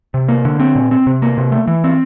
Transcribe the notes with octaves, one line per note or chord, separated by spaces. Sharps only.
C3
A#3
D3
C4
A#2
C4
C3
A#3
C3
A3
E3
C4